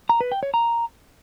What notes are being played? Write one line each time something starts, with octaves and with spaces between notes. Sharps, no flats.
A#5
B4
G5
C#5
A#5